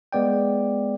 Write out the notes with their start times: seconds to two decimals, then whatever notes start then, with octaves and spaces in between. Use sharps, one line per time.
0.12 G#3 B3 D5 G5